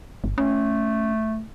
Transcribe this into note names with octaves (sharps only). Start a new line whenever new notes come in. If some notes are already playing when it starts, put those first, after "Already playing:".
G1
A3 C#4